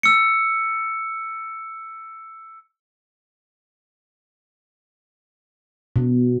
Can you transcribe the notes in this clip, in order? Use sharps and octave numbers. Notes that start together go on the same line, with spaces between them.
E6 C#7
B2